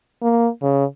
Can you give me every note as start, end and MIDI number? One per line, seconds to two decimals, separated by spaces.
0.22 0.48 58
0.62 0.84 49